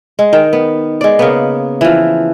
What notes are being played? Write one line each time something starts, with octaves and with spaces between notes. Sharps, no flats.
G#3
D#3 G5
B3
G#3 D5
C#3 A#3 B3
E3 F3